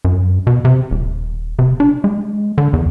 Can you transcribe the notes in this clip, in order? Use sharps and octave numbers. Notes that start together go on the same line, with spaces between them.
F#2
B2
C3
D#1
C3
D4
G#3
D3
E2